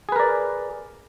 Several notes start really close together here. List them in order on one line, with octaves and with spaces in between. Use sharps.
G#4 B4 A#4 D5